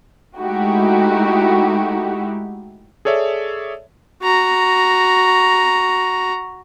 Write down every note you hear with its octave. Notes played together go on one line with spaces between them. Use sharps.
G#3 A3 D#4 E4 F#4 G4
G#4 A4 C#5 D5 E5
F#4 A#5